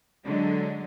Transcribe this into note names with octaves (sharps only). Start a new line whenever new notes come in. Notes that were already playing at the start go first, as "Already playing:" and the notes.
D3 F#3 G#3